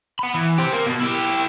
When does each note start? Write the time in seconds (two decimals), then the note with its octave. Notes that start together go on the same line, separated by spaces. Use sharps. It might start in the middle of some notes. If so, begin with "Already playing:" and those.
0.19 F#5 B5
0.34 E3
0.58 G4 C5
0.72 A#3
0.87 B2
1.01 E4 G4